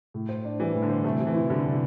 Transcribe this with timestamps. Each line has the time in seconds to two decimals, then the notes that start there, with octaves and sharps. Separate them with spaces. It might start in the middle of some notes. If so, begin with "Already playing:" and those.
0.14 A2
0.29 C5
0.45 D4
0.60 E3 G3
0.74 A2
0.82 D3
0.90 C5
1.04 C3 A3
1.20 C3
1.27 E3
1.34 E4
1.50 D3 G3
1.65 C3